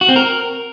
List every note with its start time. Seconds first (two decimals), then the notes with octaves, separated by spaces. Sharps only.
0.01 F#4
0.09 C4
0.16 A#4